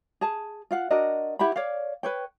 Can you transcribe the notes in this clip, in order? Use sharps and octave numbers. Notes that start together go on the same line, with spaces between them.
G#4 A5
F4 F5 F#5
D4 F#4 A#4 D#5
E4 G4 F#5 B5
C#5 D5 F5
B4 C#5 G5